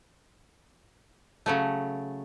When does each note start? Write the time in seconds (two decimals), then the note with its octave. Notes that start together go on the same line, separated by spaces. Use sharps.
1.46 C#3 F#3 A3